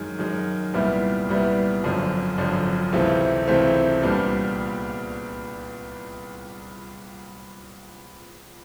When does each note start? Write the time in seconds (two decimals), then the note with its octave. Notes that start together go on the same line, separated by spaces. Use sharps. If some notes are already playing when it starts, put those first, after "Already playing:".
Already playing: F#2 D#3 G#3
0.19 F#2 D#3 G#3
0.74 C2 A#2 G3 B3 E4
1.29 C2 A#2 G3 B3 E4
1.83 G#1 F#2 D3 F3
2.38 G#1 F#2 D3 F3
2.92 C#2 C3 E3 A3 C4
3.47 C#2 C3 E3 A3 C4
4.02 C2 A#2 G3 B3 D4